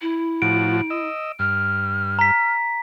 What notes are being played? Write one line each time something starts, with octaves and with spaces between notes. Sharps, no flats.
E4
A2 F3 F#4 D7
D#5 E6
G2 F6
A#5 B6